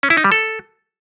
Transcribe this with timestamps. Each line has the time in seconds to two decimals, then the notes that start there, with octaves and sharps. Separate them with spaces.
0.03 C#4
0.10 E4
0.17 D#4
0.24 G3
0.32 A4